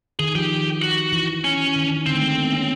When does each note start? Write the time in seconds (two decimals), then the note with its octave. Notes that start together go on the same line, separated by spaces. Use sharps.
0.19 D#3 G#4
0.35 F3 G4
0.82 F#4
1.13 E3
1.44 C#4
1.76 D#3
1.91 D#3
2.06 D3 C4
2.15 A3
2.22 G#3
2.38 B3
2.53 C#4